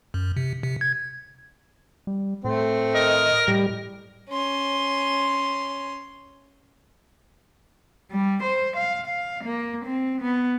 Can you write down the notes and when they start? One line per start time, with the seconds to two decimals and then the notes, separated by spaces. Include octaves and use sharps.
0.14 F#2
0.37 C3
0.63 C3
0.81 G#6
2.07 G3
2.44 A2 A3 C4
2.95 A#4 D#5
3.48 A2 G3
4.30 C#4 C6
8.11 G3
8.43 C5
8.76 F5
9.06 F5
9.44 A#3
9.85 C4
10.21 B3